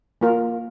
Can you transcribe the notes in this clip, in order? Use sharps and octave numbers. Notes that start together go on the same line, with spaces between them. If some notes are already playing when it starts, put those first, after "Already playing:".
A#3 F4 A#4